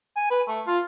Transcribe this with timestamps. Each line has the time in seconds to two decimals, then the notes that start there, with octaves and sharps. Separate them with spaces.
0.16 G#5
0.30 B4
0.48 A3
0.67 F4